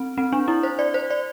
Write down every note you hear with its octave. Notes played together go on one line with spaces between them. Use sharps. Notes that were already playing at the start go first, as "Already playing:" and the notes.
Already playing: C4
C4
D4
E4
C5
D5
C5
D5